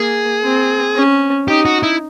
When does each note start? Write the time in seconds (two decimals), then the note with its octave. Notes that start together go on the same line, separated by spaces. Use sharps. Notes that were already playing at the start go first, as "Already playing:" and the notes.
Already playing: A#3 G#4
0.43 C4
0.95 C#4
1.48 D#4 G4
1.65 F#4
1.83 E4